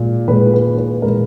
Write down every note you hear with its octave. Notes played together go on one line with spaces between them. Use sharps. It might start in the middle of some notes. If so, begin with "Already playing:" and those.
Already playing: A#2 G#3
A#2 G#3 B4
B4
B4
A#2 G#3 A#4